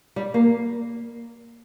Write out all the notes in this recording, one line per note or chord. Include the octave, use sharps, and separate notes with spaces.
G3
A#3